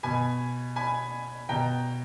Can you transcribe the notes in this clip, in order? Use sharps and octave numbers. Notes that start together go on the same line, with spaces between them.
B2 G#5 B5
G#5 B5
B2 G5 A#5